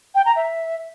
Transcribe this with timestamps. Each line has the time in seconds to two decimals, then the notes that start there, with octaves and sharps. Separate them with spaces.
0.15 G5
0.26 A#5
0.36 E5